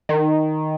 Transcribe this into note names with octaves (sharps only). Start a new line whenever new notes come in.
D#3